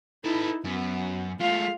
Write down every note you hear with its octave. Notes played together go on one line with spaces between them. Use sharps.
D#4 E4 A4 B4
F#2 B3
G#3 A3 F4 F5